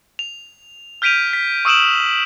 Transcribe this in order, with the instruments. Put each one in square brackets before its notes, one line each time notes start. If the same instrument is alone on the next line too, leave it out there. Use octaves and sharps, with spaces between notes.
[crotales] F7
F6 G6 B6 D7 D#7 F7
B6
C#6 D#6 E6 D7 E7 F#7